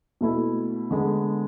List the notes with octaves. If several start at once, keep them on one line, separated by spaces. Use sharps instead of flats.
B2 A3 E4
D3 G#3 B3